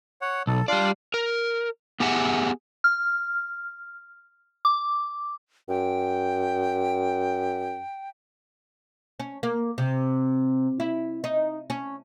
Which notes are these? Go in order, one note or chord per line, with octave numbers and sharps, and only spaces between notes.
C#5 F#5
B1 A4
G3 D4 F4 D5 F5
A#4
B3 G4 G#4 E5 F#5
F6
D6
F#2 G5
C#4
A#3
C3
E4
D#4
C#4